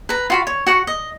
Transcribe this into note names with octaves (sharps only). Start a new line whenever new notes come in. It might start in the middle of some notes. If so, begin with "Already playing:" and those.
B4 A#5
F4 F#4 B5
C#5
F#4 F#5 C#6
D#5